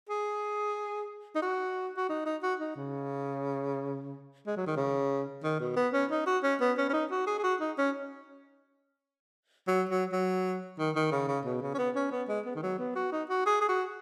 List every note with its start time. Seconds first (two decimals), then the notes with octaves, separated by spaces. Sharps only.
0.09 G#4
1.35 D#4
1.42 F#4
1.97 F#4
2.09 D#4
2.26 D#4
2.43 F#4
2.60 D#4
2.76 C#3
4.47 G#3
4.57 F#3
4.67 D#3
4.77 C#3
5.44 D#3
5.60 B2
5.76 B3
5.93 C#4
6.11 D#4
6.27 F#4
6.43 C#4
6.61 B3
6.78 C#4
6.89 C#4
6.93 D#4
7.11 F#4
7.27 G#4
7.39 G#4
7.44 F#4
7.60 D#4
7.78 C#4
9.68 F#3
9.89 F#3
10.12 F#3
10.79 D#3
10.96 D#3
11.12 C#3
11.28 C#3
11.45 B2
11.62 C#3
11.74 C#4
11.78 B3
11.95 C#4
12.12 B3
12.29 G#3
12.46 B3
12.56 D#3
12.63 F#3
12.79 B3
12.96 F#4
13.12 D#4
13.29 F#4
13.46 G#4
13.61 G#4
13.69 F#4